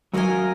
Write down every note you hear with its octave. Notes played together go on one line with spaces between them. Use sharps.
F#2 F#3 F4 A#4 D#5 G#5